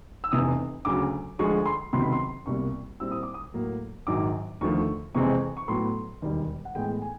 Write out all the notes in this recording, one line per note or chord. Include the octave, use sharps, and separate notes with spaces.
E6
F1 E2 C3 E3 D#6
D2 C#3 F#3 D6
D2 D3 F3 G#3 C#6
C6
C#2 C3 D#3 F#3 B3 C6
B5
C6
C2 B2 G3 A#3 C#6
A#2 G3 C4 E4 E6
D#6
D6
D#6
A2 F#3 A#3
A#1 G#2 D#3 F#3 D6
D#2 D3 F3 A3 C#6
F2 C3 E3 G#3 C4 C#6
C#6
A2 F#3 B3 C6
E1 D#2 D#3 G3
F#5
A2 E3 G#3 B3 G5
G#5